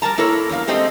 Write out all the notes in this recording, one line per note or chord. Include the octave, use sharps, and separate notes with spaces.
G3 A#4 A5 A#5
A#3 E4 A4 A#4 C#5
E2 G2 A#3 F5
G#3 A3 C4 G4 D#5